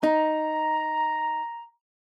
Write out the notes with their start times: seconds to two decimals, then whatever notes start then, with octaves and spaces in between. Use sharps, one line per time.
0.03 D#4 A#5